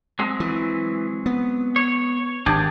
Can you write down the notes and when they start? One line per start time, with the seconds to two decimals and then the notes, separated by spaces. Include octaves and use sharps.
0.19 F#3 G#3 C4
0.40 E3
1.26 B3
1.76 C#5
2.46 G#1 D4 G4 G#4